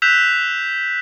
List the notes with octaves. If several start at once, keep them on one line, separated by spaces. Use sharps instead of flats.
E6 F#6 G6 B6 E7 F7